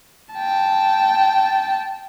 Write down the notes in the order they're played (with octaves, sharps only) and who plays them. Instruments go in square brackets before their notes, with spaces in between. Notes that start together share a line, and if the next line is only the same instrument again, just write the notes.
[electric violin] G5 A5